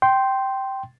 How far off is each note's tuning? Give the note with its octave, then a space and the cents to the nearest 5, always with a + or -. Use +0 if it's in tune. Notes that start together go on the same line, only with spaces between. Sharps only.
G5 -10 C6 +0